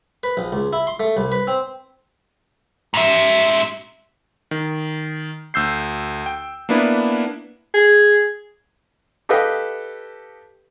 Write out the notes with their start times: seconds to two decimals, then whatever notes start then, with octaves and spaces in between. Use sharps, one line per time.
0.23 B4
0.37 A#1
0.53 C#2
0.73 E4
0.87 C6
1.00 A3
1.17 C2
1.32 B4
1.47 C4
2.94 G#2 E5
4.51 D#3
5.54 D2 E6 G6 C7
6.26 G5
6.69 A#3 B3 D4 E4 B4
7.74 G#4
9.29 G4 A4 B4 D#5 F5 G5